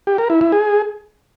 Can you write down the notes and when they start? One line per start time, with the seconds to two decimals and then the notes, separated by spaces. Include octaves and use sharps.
0.07 G4
0.18 A#4
0.30 E4
0.41 E4
0.52 G#4